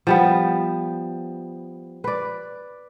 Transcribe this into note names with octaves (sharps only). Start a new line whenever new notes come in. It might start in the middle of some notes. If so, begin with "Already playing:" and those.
F3 G3 B3
B4 D5